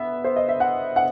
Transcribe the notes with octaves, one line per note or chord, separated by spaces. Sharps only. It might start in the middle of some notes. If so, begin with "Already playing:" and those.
Already playing: B3 E5
C5
D#5
E5
F#5
F#5